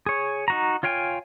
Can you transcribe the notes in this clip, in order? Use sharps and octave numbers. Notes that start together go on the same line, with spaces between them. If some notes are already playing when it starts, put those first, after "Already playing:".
G#4 C#5
D#4 F#4 A#5
F4 C#5 F5 G5 G#5